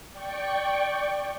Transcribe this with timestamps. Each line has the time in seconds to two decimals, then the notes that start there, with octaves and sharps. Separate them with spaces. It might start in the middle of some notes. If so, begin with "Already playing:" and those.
0.10 D5 G5 C#6